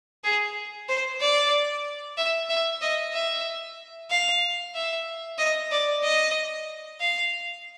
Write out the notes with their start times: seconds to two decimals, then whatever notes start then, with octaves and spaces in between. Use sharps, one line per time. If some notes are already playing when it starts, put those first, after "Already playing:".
0.24 G#4
0.89 C5
1.20 D5
2.17 E5
2.49 E5
2.81 D#5
3.13 E5
4.11 F5
4.75 E5
5.38 D#5
5.71 D5
6.03 D#5
7.00 F5